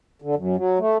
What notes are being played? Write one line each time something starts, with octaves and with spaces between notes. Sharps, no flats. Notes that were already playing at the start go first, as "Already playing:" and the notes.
D3
F#2
F#3
A3